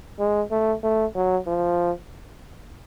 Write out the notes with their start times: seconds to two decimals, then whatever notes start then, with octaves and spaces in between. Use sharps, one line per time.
0.19 G#3
0.51 A3
0.83 A3
1.15 F#3
1.47 F3